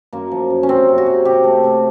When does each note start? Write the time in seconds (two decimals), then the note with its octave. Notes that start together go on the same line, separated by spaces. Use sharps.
0.13 F#2 A#3
0.32 F3
0.50 F#2
0.63 C#4
0.69 C3 C4
0.89 C3
0.98 F#4
1.06 C3
1.25 C3 G4
1.44 A3
1.64 C3